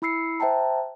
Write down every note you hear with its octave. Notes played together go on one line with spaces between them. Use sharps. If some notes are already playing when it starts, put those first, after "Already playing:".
E4 B5 E6 C7 C#7
C5 E5 G5 A5 A#5